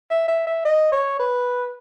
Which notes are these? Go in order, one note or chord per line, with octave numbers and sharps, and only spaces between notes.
E5
E5
E5
D#5
C#5
B4